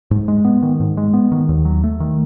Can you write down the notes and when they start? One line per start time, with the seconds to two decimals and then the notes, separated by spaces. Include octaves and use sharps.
0.11 G#2
0.28 G#3
0.45 B3
0.62 D#3
0.80 G#2
0.97 G#3
1.13 B3
1.32 D#3
1.49 D#2
1.65 F#3
1.84 A3
2.00 D#3